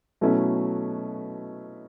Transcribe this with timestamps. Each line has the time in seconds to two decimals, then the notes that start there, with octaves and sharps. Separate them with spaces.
0.21 B2 F#3 A3 C#4 E4